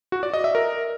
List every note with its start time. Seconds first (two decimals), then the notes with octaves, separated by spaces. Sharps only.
0.12 F#4
0.23 D5
0.33 D#5
0.44 E5
0.55 A#4